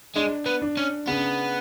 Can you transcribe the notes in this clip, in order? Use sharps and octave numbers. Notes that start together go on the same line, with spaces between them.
G#3 D4
B3
D4
C#4
C#3 B3